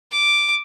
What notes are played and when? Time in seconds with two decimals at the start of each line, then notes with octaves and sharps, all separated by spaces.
0.12 D6